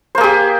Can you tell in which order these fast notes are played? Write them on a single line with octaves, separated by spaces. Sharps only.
C5 A#3 G#4 G4